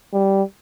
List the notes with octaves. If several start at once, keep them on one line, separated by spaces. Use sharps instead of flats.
G3